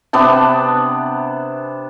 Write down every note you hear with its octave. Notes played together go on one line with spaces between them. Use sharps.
C3 B3 D4 A5